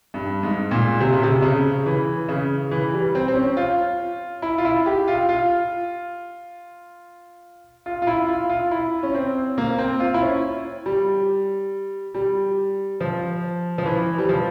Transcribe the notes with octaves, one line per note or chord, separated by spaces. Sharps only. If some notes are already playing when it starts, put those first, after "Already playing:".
G2
G#2
A#2
C3
C#3
C3
C#3
E3
C#3
E3
G3
C4
C4
C#4
F4
E4
F4
E4
G4
F4
F4
F4
F4
E4
F4
F4
E4
C#4
C4
A#3
C4
F4
E4
C#4
G3
G3
F3
F3
E3
G3
F3